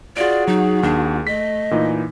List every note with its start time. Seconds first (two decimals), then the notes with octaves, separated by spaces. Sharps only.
0.17 F4 F#4 G#4 D5 D7
0.48 F#3 D#4
0.83 D#2 D4
1.27 A3 D#5 B6
1.71 A#2 E3 D#4